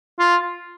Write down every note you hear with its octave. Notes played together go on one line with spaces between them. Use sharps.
F4